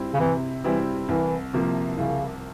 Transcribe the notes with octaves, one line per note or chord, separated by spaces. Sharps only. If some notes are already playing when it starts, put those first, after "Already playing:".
Already playing: G3 C4 E4
C#3
C3 E3
E3 G3 C4 E4
C2 E3
C3 F3 A#3
C2 C#3